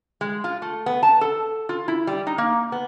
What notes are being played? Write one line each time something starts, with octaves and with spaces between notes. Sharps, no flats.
G#3
F4
A3
B3
A5
A4
F4
E4
G3
D#4
A#3
B3